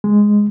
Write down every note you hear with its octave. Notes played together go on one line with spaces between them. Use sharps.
G#3